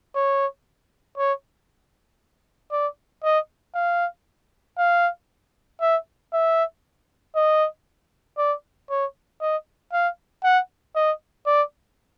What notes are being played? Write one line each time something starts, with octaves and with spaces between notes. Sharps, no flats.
C#5
C#5
D5
D#5
F5
F5
E5
E5
D#5
D5
C#5
D#5
F5
F#5
D#5
D5